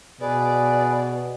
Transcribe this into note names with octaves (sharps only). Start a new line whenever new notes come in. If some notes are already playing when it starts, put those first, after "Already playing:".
B2 G#4 B4 D5